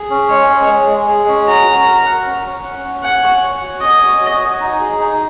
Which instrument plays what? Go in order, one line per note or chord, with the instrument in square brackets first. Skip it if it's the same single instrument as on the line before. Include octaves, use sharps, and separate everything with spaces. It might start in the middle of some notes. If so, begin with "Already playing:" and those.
Already playing: [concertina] G#4
C#4
[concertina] G#3 [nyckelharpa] C#5
[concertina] G#4
G#3
G#3
G#4
C#4
[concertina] F#4 [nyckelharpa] A#5
[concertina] F#4
A#4
F#5
C#4
C#4
F#5
C#4
[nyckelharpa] F#5 [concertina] G#5
[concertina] C#5
C#5
F#4
[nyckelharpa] D#5 [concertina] G#5
[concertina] C#5
F#4
G#5
D#4
G#4
D#4